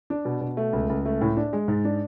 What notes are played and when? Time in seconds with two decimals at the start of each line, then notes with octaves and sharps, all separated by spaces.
0.10 D4
0.25 B2
0.41 B2
0.57 A3
0.73 C#2
0.89 C#2
1.06 A3
1.21 A2
1.37 D4
1.53 G#3
1.68 G#2
1.85 D4